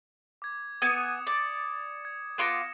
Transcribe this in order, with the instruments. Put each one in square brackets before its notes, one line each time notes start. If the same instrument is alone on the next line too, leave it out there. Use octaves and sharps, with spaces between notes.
[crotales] D6 G#6
[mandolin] B3 G#5 [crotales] D#6 C#7 E7
[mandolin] D5
[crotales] G#6
[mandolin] B3 F4 D6 [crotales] A#6 C#7 E7